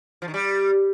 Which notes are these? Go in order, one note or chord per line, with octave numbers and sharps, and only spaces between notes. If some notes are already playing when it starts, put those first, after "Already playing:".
F3
D#3
G3